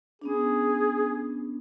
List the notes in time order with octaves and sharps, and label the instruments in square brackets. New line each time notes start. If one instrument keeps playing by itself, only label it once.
[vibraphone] B3 C#4 D4 [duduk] G#4